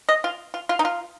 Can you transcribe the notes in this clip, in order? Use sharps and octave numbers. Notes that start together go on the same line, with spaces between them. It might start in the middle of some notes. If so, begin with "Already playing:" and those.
D#5
F4
F4
F4
D#4
F4